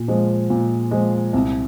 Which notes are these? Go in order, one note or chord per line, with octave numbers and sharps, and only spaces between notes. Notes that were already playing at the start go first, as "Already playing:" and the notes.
Already playing: A#2
F3 G#3
A#2
F3 G#3
C2